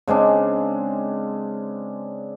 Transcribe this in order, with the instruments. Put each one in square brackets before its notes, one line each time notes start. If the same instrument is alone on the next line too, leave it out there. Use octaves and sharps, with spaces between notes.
[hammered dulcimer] C#3 G#3 C4 D4